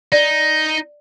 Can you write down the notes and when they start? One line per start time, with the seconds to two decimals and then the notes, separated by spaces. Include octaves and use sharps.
0.12 D#4 D5